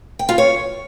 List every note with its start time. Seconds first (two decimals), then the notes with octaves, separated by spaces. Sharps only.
0.19 G5
0.29 F4
0.38 C#5